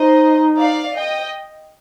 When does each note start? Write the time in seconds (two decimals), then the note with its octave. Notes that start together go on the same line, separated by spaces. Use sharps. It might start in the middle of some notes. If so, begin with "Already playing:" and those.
Already playing: D#4 C5 D#5
0.58 D5 F5
0.97 D#5 G5